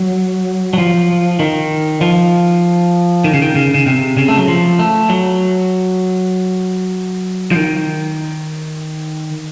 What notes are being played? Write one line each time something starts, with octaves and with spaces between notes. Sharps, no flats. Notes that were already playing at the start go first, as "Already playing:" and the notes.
Already playing: F#3
F#3
F3
D#3
F3
D#3
C#3
D#3
C#3
C#3
C3
C#3
A3
F#3
F3
A3
F#3
F3
D#3